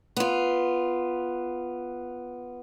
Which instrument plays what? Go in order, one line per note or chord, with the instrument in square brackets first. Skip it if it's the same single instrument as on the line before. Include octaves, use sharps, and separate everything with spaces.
[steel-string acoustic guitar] B3 F4